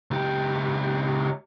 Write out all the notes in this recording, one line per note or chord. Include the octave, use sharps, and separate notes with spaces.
C#2 G4